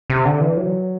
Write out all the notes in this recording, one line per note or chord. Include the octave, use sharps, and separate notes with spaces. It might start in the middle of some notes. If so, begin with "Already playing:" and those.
C3
D3
E3
F#3